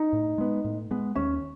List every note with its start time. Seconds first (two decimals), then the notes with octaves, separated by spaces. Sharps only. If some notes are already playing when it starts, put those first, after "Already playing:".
Already playing: D#4
0.13 A2
0.38 G#3 B3
0.65 A2
0.91 G#3 B3
1.15 D#2 C#4